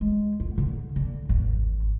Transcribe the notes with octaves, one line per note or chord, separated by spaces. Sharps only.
G#3
F4
D3
D3
G#1 E2